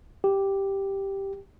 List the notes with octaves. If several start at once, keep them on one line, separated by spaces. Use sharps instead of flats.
G4